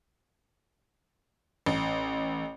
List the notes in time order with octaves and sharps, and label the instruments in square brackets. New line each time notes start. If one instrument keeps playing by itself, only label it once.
[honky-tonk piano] A1